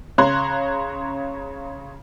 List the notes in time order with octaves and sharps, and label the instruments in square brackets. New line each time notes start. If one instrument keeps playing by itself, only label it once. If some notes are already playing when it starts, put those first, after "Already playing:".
[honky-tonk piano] C#3 C#5 A#5 C6 F#6 G#6